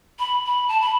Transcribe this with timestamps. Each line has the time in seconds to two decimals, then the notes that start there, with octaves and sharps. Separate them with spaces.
0.19 B5
0.46 B5
0.68 A5
0.81 B5